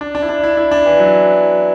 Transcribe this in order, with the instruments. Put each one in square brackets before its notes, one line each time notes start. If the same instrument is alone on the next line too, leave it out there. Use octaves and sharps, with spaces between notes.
[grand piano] D4
D4
E4
D4
E4
E4
D4
E3
F#3